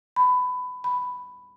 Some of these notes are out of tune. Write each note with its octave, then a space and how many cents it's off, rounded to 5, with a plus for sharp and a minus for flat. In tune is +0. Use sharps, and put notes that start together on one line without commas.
B5 +20
B5 +5